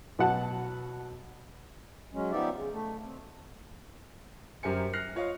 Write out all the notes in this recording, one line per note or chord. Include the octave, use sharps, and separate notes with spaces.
B2 F#3 F#5 A5
F#3 G#3 C#4
F3 B3 D#4 G4 D5 E5
C#3
A3
C4
F#2 G4 A#4 C5 G#5 C#7
F6 F#6 A#6 C7
F4 C#5 D#5 F5 C#6